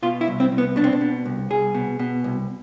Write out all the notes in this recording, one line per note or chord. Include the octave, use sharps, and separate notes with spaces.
B2 F4
E4
C2
C4
C2
B3
B2 D4
C4
D4
B2
C2
C2 G#4
B2
B2
C2